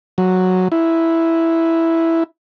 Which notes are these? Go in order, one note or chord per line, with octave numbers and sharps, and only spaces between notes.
F#3
E4